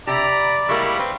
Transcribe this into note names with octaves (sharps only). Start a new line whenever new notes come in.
C3 G4 D5 A#5 B5
G3 G#3 A#3 E4 C#6
C4 B4